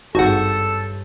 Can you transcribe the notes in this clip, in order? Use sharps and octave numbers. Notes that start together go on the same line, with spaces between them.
G#1 G2 F#4 A4 C#5 F#5 G6